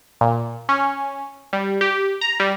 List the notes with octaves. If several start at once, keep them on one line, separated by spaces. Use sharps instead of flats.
A#2
C#4
G3
G4
A#5
G3